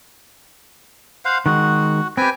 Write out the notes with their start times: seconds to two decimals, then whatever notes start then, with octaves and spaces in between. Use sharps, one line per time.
1.25 C5 F5 F#5
1.46 D#3 G#3 F#4 F#5
2.17 C4 G4 B4 G5 G#5